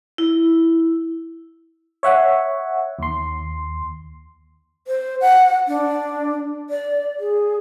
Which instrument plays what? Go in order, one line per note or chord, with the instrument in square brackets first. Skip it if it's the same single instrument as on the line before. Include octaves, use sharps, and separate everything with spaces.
[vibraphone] E4
[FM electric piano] C#5 E5 F#5
D#2 C6
[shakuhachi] C5
F#5
D4
D5
G#4